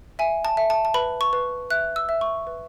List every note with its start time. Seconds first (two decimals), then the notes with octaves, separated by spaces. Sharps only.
0.19 E5 G#5
0.45 A5
0.57 E5
0.70 A5
0.85 A5
0.94 B4 B5
1.21 C#6
1.33 B4
1.70 E5 F#6
1.96 E6
2.09 E5
2.21 C#6
2.47 B4